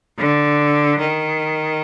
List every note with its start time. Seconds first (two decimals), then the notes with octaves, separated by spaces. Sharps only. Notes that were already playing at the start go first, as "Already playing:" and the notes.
0.18 D3
0.99 D#3